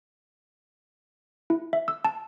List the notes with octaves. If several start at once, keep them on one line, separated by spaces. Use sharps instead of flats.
E4
E5
E6
A5